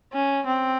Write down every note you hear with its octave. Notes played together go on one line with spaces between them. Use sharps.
C#4
C4